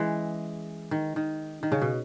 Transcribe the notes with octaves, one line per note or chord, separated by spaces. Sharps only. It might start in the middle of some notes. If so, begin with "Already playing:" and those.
Already playing: E3 G#3 C#4
D#3
D#3
D#3
C#3
B2